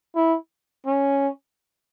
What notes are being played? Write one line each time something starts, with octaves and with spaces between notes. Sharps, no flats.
E4
C#4